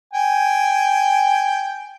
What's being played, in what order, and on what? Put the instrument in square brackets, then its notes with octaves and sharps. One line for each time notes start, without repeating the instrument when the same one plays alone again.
[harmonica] G5 G#5